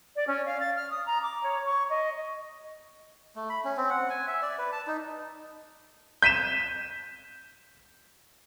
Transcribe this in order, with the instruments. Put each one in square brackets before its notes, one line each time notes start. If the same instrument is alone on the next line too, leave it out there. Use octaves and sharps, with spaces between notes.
[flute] D5
C#4
F5
A6
F6
D#6
A#5
D6
C#5
C#6
D#5
[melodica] A3
B5
C#4
C4
F#5
G#5
E5
D5
B4
A5
D#4
[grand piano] G6 B6 D#7 E7